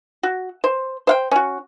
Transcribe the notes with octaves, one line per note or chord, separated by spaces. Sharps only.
F#4
C5
C5 F5 G5
C#4 F#4